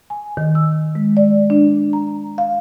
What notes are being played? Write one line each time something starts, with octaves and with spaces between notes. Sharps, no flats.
G#5
D#3
E6
G#3
D5
D4
A#5
F5